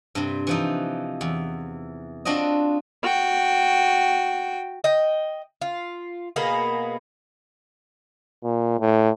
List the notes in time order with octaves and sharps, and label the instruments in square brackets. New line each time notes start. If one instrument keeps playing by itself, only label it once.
[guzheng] G2 C3
E3 F3 D#4
E2
C4 D4 F4 F#4 D#5
[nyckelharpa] F#4 G5
[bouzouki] D#5 G5
F4
B2 A#3 B3 G#4
[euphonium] A#2
A2